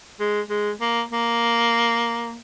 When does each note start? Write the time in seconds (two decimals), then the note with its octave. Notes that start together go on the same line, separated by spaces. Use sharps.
0.20 G#3
0.49 G#3
0.81 A#3
1.11 A#3